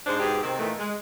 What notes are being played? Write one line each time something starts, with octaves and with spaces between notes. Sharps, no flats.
G#2 G#3 D4 C5
G#2 B2 G4 G#4
C3 D#3 C4
A#2 D#3 E3 A3
G#3